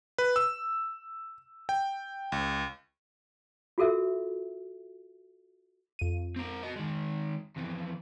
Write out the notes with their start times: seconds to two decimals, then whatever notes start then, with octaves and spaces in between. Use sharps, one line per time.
0.18 B4
0.36 E6
1.69 G5
2.32 C#2
3.78 F4 F#4 A4 A#4 E5
5.99 F2 D#7
6.36 C4 A#4
6.63 F#4 D#5
6.76 D#3 G#3
7.57 F2 E3